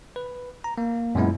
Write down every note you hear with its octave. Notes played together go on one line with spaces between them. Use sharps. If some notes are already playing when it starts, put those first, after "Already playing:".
B4
A#5
A#3
F#2 A#2 G#3 B3 E4